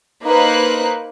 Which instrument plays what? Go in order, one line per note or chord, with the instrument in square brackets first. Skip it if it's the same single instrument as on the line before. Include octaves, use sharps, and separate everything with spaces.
[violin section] A#3 D#4 B4 C5 F#6